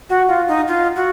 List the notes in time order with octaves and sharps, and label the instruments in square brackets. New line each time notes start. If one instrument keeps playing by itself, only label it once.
[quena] F#4 [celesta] F#5
[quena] F4 [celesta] F5
[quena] D#4
F4
F#4